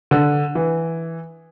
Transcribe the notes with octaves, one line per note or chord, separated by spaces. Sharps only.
D3
E3